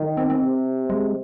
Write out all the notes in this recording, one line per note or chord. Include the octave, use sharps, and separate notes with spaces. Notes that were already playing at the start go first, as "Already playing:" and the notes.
Already playing: D#3
C4
C4
C3
G#3